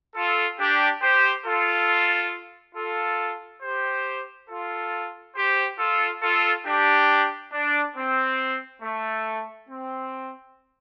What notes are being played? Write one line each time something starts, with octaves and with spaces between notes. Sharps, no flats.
F4 A4
D4 G4
G4 C5
F4 A4
F4 A4
G4 C5
F4 A4
G4 C5
F4 A4
F4 A4
D4 G4
D4
C4
A3
C4